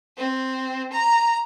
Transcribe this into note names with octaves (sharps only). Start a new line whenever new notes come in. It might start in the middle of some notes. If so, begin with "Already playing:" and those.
C4
A#5